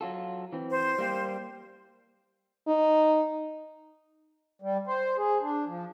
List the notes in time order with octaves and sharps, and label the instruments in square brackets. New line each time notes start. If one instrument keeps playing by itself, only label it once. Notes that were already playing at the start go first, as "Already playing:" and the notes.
[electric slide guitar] F#3 F4 A4
E3 C4
[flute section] C5
[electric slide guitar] G3 A#3 G4
[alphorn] D#4
[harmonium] G3
C5
G#4
D4
F3